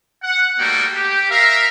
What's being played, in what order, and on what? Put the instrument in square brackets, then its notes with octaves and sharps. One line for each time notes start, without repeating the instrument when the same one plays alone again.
[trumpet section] F#5
G3 A3 A#3 D#4 F#4 G5
G4
A#4 E5 F5